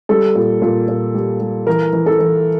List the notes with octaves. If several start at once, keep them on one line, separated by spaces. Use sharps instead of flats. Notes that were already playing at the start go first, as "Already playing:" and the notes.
G3 A4
A#2
A#2
A#2
G3
G3
E3 A#4
E3
A4
E3